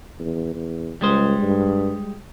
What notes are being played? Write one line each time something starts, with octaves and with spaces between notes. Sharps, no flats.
E2
E2
C#2 G3 G#3 C5
G2